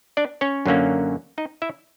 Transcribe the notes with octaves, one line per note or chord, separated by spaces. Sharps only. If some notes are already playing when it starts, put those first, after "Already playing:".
D4 D5
C#4 C#5
F#2 D3 F#3 A#3 C#4
D#4 D#5
E4 E5